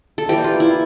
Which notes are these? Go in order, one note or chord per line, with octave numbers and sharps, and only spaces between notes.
A4
E3 G3 A#3 G4
F4
E4